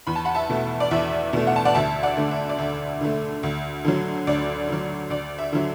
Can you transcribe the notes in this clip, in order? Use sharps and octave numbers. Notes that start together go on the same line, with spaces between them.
E2 B5
A5
F#5 B5
E5 A5
B2 A3
D5
E2 E5
B2 A3
F#5
A5
D5 F#5
D2 E5 A5
D5 F#5
D3 A3
E5
D5
D2 E5
D3 A3
D2
D3 F#3
D2 D5
D3 F#3
D2 D5
E5
D3 F#3